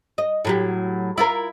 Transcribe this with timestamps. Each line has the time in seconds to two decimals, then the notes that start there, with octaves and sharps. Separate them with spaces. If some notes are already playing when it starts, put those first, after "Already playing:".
0.18 D#5
0.45 A2 F#3 G4
1.18 E4 F4 A#4